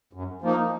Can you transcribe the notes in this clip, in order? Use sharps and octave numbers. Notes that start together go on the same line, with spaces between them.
F#2
F3 A#3 D#4